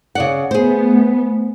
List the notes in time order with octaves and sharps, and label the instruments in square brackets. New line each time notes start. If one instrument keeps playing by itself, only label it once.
[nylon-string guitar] C#3 D5 F#5
[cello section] A3 B3 [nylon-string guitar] G#4 C5